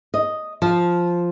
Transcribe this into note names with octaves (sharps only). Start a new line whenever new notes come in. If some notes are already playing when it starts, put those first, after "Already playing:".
D#5
F3